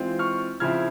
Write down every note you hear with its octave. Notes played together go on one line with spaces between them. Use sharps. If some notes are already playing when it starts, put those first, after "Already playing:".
Already playing: E3 G#3 C4 F4
C#6 F6
C#3 F3 C4 E4 F6 G#6